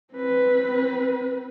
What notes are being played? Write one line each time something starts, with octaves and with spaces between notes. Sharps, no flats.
C4 B4